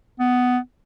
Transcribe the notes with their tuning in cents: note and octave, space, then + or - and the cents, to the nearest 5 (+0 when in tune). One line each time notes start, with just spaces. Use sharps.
B3 +10